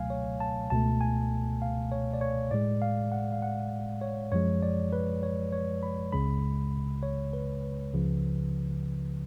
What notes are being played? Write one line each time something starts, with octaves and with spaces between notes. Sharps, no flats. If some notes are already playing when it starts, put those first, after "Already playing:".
Already playing: C#2 B2 F#3 A3 F5 G#5
C#5
A5
C#2 B2 A3 A5
G#5
F5
C#5
D5
C#5
A2 G#3 D5
F5
F#5
F5
F#5
C#5
F#2 F3 G#3 C#5
D5
B4
C#5
C#5
B5
C#2 C#3 G#3 B5
C#5
B4
B4
C#2 C#3 F3